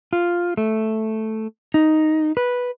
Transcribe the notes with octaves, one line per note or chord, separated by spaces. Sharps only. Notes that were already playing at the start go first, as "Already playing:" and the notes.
F4
A3
D#4
B4